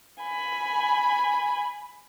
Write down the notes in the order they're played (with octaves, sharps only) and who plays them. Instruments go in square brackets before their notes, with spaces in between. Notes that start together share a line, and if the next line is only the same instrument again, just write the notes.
[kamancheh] G#5 B5